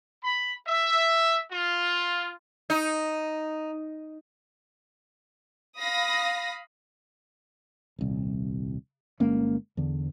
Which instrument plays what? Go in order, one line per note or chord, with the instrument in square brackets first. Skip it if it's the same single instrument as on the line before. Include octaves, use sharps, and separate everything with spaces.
[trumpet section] B5
E5
F4
[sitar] D#4
[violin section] F5 B5 D#6 A#6
[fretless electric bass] D#1 C2
G1 G#3 A#3 C#4
E2 D3